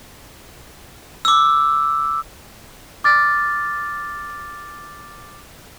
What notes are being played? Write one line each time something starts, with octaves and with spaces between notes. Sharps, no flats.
D6 E6
D6 F6 A6